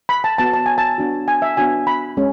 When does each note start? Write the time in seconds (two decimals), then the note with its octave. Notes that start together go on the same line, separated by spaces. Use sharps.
0.09 B5
0.24 A5
0.38 B3 F#4 A5
0.53 A5
0.66 G#5
0.78 A5
0.98 B3 D4 F#4
1.28 G#5
1.42 E5
1.57 B3 D4 F#4 G#5
1.87 B5
2.17 G#3 C#4